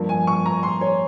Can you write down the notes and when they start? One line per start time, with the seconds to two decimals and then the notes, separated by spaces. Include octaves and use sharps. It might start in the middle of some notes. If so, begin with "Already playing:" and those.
Already playing: G2 F3 A#3
0.09 G#5
0.27 C#6
0.46 A#5
0.63 C6
0.81 C#5